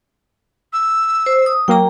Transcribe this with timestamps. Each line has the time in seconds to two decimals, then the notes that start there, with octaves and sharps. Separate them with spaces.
0.73 E6
1.26 C5
1.46 D#6
1.68 F#3 A#3 G5 A#5